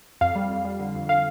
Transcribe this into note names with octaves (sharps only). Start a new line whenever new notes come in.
F2 F5
G3
F2
G3
D3
F2
D3 F5